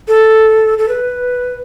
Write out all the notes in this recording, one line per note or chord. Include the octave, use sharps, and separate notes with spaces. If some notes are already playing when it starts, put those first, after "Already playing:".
A4
A4
B4